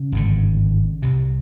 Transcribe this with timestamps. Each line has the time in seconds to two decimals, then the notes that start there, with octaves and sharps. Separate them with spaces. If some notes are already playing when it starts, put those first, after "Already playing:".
Already playing: C#3
0.12 G#1 G2 D3
1.02 C2 C3